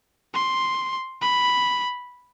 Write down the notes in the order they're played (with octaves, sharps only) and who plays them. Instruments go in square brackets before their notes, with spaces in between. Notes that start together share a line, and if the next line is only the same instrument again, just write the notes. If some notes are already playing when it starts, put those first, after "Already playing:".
[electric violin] C6
B5